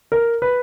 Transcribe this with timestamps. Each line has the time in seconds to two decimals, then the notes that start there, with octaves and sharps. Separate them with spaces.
0.12 A#4
0.42 B4